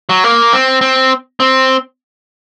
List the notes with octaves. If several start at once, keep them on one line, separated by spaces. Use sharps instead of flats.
F#3
A#3
C4
C4
C4